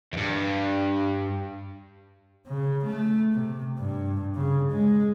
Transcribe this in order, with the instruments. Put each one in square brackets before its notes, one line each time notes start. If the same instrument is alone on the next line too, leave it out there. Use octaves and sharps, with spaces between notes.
[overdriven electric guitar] E2 G2
[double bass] C#3
A3
C3
G2
C#3
G#3